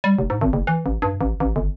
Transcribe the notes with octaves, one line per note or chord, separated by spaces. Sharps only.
G3
F1
G#2
G#1
F#1
E3
A1
G2
A1
A1
G1